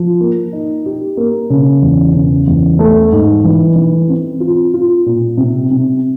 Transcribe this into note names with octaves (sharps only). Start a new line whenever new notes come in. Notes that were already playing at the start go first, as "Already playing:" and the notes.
Already playing: F3
A#3
D#4
G4
A#3
C#3
E2
C#3
E2
A3
G#2
E3
E3
C4
F4
F4
A#2
C3
C3